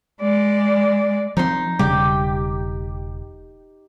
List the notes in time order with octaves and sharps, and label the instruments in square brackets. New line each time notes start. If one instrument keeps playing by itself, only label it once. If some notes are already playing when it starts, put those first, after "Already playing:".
[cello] G#3 D5
[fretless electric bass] F3 C4 [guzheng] D#4 C6
[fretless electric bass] E1 C#3 G3 [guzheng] G4